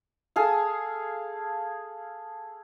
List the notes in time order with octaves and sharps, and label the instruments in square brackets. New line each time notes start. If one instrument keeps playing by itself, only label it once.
[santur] G#4 A4 F5